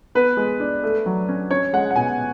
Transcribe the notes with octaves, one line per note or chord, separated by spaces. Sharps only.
B3 B4
G#3
D4
A3
F#3
C#4
C#4 C#5
G#3 F#5
F#5
B2 G#5